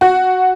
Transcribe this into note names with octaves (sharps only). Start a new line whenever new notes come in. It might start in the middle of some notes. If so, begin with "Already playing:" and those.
F#4